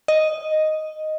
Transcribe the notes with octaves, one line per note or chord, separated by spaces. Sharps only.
D#5